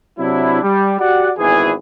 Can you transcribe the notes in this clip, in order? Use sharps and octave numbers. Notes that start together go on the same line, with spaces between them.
C3 F#3 D4 E4
G3
F#4 G4 D5 F#5
G#1 E2 E3 G#4